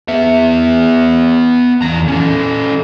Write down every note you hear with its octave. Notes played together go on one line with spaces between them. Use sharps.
B3 E5
E2 A#5
C#4 A4